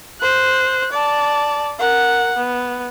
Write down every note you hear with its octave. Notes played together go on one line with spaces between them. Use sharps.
C5 F#6
D5 A5
A#4 F#5
B3